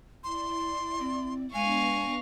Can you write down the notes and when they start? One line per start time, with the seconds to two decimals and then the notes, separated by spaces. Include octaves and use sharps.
0.24 E4 D5 C6
1.00 C4
1.54 G#3 B3 D4 F5 G#5 C#6 A#6